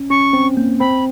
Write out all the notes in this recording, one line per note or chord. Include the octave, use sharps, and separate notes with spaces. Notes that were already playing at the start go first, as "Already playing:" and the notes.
Already playing: C#4
C#4 C#6
C4
A#3
C4 B5